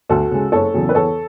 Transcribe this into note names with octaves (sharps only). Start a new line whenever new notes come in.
D2 F#4 A4
C#3 G#3
F#1 A4 C#5
E2 C#3 F#3
B4
E2 A4 C#5